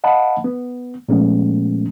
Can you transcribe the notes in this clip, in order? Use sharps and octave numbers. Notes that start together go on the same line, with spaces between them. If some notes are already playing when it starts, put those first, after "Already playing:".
D#5 F5 F#5 A5 B5
B3
A#2 F3 G#3 A3 B3 C#4